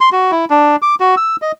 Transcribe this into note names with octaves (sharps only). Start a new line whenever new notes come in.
C6
F#4
E4
D4
D6
F#4
E6
D#5